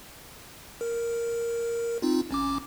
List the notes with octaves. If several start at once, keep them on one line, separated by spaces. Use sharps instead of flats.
A#4
C4 D#4 F4
A1 C#4 D6